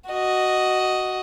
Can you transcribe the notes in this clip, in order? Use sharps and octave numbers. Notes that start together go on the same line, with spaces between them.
F#4 D#5